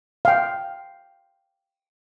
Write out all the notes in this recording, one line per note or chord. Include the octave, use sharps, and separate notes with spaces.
F5 G5